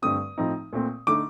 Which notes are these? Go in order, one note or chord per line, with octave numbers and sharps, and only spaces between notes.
G2 D3 A3 C4 D#6
A2 F3 C4 D#4
A#2 A3 C4
D3 A3 D#4 D6